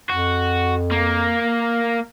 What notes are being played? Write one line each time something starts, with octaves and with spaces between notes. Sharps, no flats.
F2 F#4
A#3